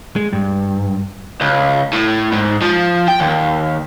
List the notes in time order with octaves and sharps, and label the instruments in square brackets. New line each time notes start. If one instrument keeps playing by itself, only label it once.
[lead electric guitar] G#3
G2
[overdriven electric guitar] C#2
A2
G#2
F3
G5
D#2